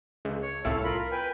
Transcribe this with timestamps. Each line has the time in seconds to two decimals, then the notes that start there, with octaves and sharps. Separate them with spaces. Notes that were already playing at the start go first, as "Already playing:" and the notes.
0.25 C#2
0.42 C#5
0.65 C2 A2 E4 A4 F5
0.84 F4 A#4 B5
0.98 A#4
1.12 B4 G5 G#5